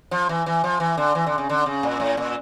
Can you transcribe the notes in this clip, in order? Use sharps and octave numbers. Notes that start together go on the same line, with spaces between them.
F3
E3
E3
F3
E3
D3
E3
D3
C#3
D3
C#3
A#2
A2
A#2